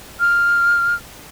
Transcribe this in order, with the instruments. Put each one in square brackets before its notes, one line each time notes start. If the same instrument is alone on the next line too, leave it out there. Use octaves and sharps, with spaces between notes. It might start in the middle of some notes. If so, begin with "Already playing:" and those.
[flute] F6